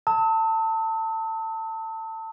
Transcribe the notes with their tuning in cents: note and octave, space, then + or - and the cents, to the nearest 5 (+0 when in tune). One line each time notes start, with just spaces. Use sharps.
A5 +25 E6 -45